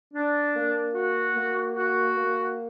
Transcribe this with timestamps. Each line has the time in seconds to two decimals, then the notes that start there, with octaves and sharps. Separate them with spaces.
0.14 D4
0.54 A#3
0.95 F#4
1.35 A#3
1.75 F#4
2.15 A#3